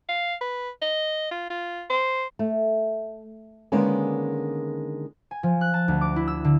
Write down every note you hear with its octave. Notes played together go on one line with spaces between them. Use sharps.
F5
B4
D#5
F4
F4
C5
A3
D3 D#3 G#3 A#3 B3 C#4
G#5
F3
F#6
A5
D2
D6
E4
E6
D3